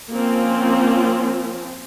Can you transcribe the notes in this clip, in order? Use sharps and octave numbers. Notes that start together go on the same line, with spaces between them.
F3 A#3 C4 C#4 F4